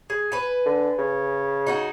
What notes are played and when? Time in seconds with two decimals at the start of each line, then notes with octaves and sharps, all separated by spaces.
0.10 G#4
0.32 B4 G#5
0.65 D3
0.98 C#3
1.67 D#4 F#4 G#4